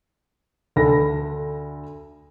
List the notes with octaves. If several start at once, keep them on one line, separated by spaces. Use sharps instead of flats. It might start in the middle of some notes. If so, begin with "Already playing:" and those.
D2 A4 B5 A#6